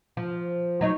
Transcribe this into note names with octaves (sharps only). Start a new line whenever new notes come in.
F3
F#3 D#4 C#5